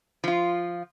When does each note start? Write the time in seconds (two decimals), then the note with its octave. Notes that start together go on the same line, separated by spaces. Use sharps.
0.24 F3 F4